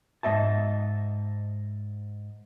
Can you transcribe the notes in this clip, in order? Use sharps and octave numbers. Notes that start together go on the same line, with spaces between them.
G#2 D#5 E5 A5